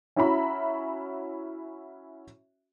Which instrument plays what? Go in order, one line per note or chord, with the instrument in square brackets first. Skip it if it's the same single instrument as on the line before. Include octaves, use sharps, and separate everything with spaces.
[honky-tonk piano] C#4 E4 F#4 E5 A#5 B5